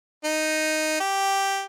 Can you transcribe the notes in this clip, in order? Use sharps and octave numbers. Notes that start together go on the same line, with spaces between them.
D#4
G4